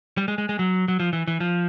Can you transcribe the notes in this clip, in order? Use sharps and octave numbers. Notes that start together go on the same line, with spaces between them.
G3
G#3
G#3
G#3
F#3
F#3
F3
E3
E3
F3